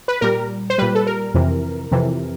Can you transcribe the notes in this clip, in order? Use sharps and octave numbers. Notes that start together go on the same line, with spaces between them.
B4
A#2 G3 A#4
C5
A#2 G3 B4
A4
A#4
F2 C3 E3
F2 C3 E3